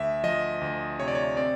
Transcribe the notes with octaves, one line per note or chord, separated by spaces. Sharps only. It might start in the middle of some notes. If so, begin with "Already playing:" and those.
Already playing: D2 E5
F3 D#5
D2
C3 C#5
D5
C#5
C4 D5